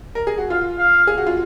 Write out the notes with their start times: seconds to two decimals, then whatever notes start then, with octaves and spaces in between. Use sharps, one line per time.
0.15 A#4
0.27 G#4
0.38 F#4
0.50 F4 F5
0.79 F5
1.07 G#4
1.18 F#4
1.27 F4